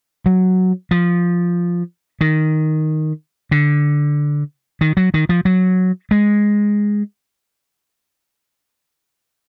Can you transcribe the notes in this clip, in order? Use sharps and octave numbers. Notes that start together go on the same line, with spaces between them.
F#3
F3
D#3
D3
D#3
F#3
D#3
F3
F#3
G#3